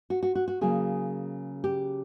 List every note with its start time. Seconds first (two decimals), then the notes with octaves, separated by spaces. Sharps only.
0.10 F#4
0.23 F#4
0.35 F#4
0.48 F#4
0.61 C#3 F#3 A#3 G#4
1.64 G4